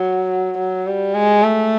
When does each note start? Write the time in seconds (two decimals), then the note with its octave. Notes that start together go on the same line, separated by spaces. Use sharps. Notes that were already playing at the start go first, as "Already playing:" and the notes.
Already playing: F#3
0.58 F#3
0.87 G3
1.14 G#3
1.43 A3